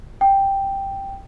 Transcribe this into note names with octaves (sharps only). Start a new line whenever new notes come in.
G5